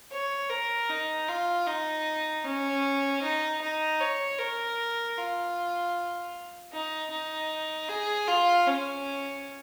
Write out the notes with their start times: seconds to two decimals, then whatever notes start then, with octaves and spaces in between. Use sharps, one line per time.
0.12 C#5
0.50 A#4
0.90 D#4
1.28 F4
1.67 D#4
2.44 C#4
3.22 D#4
3.61 D#4
4.00 C#5
4.39 A#4
5.17 F4
6.73 D#4
7.11 D#4
7.88 G#4
8.27 F4
8.67 C#4